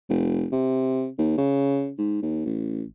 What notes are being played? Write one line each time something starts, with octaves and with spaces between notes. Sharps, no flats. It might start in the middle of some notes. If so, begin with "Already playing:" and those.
F1
C3
D#2
C#3
G#2
D#2
A1